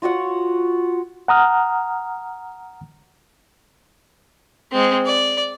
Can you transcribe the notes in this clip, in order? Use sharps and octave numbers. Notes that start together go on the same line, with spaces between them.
F4 F#4 C#5 F#5
F#5 A#5 D#6 F6
G#3 C4
D5